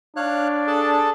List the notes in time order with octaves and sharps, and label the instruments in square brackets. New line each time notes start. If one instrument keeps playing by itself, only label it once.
[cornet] D4 [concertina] C#5 F5 F#6
[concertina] G#4 A4 A5